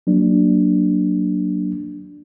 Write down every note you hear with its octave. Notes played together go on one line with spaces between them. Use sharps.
F#3 A#3 D4